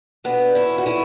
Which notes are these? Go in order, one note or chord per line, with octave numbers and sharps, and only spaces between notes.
B2 B3 D4
C#4 E4
E2
F#4
C#4 E4